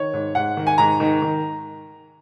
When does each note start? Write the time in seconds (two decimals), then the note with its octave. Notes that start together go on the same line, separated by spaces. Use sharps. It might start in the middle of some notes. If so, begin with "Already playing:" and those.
Already playing: D#3 C#5
0.13 G#2
0.35 G#2 F#5
0.57 D#3
0.67 G#5
0.78 G#2 A#5
1.00 D#3
1.22 D#3